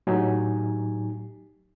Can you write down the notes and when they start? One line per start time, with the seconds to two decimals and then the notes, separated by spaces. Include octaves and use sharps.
0.07 A2 F#3 D#4 G4 G#5